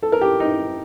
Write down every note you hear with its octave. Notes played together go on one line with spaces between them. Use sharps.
A4
A#4
G4
D#4